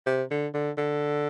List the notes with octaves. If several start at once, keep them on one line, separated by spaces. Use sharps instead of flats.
C3
D3
D3
D3